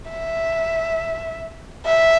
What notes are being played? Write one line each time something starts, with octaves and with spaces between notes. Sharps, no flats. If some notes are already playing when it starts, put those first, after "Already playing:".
E5
E5